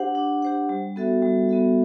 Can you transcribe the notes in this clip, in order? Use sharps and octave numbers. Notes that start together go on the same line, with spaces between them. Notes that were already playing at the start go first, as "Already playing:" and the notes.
Already playing: D4 G4 C5 F#5
D4
G4 C5 F#5
G3
B3 F#4 A4 E5
G3
B3 F#4 A4 E5